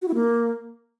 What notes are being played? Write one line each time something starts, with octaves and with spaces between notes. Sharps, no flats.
F#4
E4
A#3